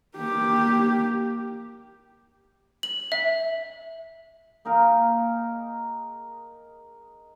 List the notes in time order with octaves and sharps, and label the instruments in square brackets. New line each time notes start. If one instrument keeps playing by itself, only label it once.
[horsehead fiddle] A#3 G4
[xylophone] F#7
E5
[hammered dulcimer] A#3 D#4 G#4 A#4